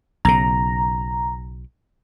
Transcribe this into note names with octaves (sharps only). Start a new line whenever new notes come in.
B1 C#3 A#5